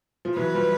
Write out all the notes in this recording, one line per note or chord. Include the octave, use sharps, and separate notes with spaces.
F3
E3 F#3 B4
F3 G3